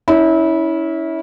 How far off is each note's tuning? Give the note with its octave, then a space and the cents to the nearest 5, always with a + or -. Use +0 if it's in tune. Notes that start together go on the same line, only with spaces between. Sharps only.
C#4 +20 E4 -25